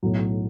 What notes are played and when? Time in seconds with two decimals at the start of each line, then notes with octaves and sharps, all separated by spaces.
0.03 B1 A2 F#3